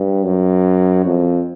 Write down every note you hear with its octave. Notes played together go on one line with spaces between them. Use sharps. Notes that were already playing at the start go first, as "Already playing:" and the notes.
Already playing: G2
F#2
F2